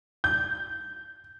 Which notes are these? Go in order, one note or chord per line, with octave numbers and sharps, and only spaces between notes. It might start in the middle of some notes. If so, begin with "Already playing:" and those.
G6